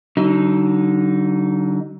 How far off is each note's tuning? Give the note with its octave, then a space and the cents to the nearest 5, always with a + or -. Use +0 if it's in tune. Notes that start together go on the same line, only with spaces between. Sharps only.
D3 -15 F#3 +40 D#4 +0